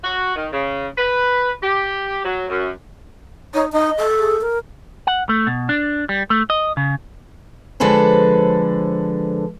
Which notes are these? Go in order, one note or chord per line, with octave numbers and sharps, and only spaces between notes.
F#4
D#3
C#3
B4
G4
F#3
F#2
D#4 C#5
D#4 D#5
A4
G#4
A#4
F#5
A3
B2
D4
G3
A3
D#5
C#3
D3 F3 G#3 A4 B4 C5